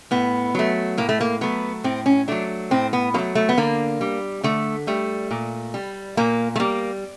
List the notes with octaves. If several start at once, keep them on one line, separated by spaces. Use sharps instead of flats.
A2 B3
F#3 A3
A2 A#3
A3
A#3
F#3 A3 B3
A2 C4
C#4
F#3 A3 D4
A2 C4
B3
F#3 A3 A#3
A3
B3
D3 A#3
G3
D3 A3
G3 A3
A#2
G3
A#2 A#3
A3
G3 A#3